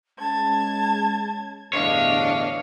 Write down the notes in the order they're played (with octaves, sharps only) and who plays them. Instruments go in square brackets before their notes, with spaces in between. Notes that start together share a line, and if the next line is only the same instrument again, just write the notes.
[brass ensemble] G#3 C#4 [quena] A5 [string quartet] G#6
[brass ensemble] G1 E2 A2 [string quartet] D4 F5 [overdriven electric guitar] C#5 [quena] D#5